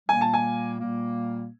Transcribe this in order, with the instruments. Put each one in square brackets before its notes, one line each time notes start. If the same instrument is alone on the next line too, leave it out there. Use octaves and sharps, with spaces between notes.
[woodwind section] A#2 G3 A#3 [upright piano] G#5
[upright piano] A5
G#5
[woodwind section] A#2 G3 A#3